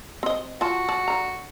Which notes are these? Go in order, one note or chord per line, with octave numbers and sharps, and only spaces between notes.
C4 D#5
F4 F#4 A5
D5 A5
D3 A#5